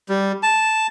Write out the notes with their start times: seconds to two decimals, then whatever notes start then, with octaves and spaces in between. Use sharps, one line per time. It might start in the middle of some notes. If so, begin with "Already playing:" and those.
0.09 G3
0.43 A5